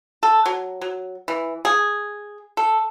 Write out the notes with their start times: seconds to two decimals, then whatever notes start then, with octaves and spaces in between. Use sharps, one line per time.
0.23 A4
0.46 F#3
0.81 F#3
1.28 E3
1.65 G#4
2.57 A4